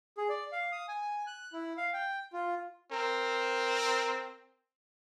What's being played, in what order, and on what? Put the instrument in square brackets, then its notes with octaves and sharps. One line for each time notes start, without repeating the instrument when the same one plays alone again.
[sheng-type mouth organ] G#4
D5
F5
D#6
G#5
F#6
E4
F5
G5
F4
[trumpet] C4 [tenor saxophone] A#4